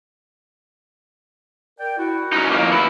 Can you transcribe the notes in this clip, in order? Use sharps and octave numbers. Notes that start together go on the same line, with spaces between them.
A#4 D5 G5
E4 F#4
C#4 D#4
F2 A#3
B3 E4